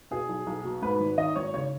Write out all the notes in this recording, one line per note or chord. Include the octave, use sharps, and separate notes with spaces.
B2 G#4
B1
B1
B2
G#2 B4
G#1
D#3 D#5
G#1 C#5
C#3 C#5